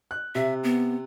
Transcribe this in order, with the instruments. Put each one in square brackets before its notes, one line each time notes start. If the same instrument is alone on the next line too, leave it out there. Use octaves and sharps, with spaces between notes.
[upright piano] F#6
[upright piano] C3 [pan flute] E5
[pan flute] B3